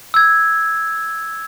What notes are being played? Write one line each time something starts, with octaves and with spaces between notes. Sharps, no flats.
E6 G#6